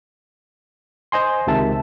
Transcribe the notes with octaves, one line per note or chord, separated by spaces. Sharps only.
C5 D#5 G#5 C6
C#2 C3 D#3 E5 A5